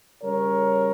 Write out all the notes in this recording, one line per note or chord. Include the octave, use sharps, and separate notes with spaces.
C#3 G3 A#4 C#5